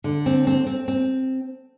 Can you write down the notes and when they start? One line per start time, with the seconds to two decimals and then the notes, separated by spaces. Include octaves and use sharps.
0.04 D3
0.26 C4
0.47 C4
0.67 C4
0.88 C4